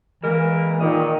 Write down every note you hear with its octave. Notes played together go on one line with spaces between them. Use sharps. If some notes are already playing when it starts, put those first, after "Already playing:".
E3 G#3 A#3 A#4
A#2 D#3 D#5